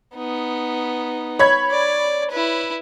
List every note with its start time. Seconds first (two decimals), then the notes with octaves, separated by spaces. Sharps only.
0.16 B3 D#4
1.39 C#5 B5 G#6
1.71 D5
2.31 E4 B4